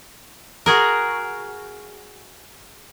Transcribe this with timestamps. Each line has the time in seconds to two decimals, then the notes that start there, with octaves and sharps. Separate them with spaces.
0.66 F#4 G#4 A#4